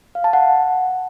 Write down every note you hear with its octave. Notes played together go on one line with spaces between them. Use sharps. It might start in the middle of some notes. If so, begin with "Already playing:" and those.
F5
A5
F#5